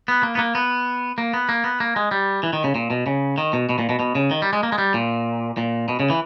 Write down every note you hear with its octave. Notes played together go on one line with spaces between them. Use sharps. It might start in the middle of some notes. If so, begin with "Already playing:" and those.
B3
A#3
B3
A#3
B3
A#3
B3
A#3
B3
A#3
G#3
G3
E3
D#3
C#3
A#2
B2
C#3
D#3
B2
B2
A#2
B2
B2
C#3
D#3
G3
G#3
A#3
G#3
G3
A#2
A#2
B2
C#3
E3